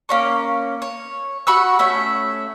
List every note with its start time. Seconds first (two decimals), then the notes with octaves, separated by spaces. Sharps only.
0.09 A#3 C#4 C#6
0.82 C#5
1.47 F#4 B5 C#6 E6
1.79 A3 C#4 E5